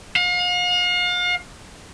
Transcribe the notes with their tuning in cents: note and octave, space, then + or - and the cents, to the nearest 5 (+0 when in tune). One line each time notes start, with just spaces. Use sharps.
F5 +40